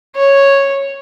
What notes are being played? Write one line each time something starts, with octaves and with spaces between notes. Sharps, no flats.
C#5